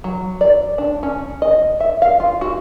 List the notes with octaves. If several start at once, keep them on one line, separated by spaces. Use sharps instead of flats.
F#3
D5
D4
C#4
D#5
E5
F5
F4
F#4